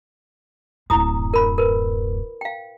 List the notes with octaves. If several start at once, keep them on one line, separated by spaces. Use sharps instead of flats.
D1 F#2 E4 A#5 D#6
A#4 B5
A#4 B4
F5 G5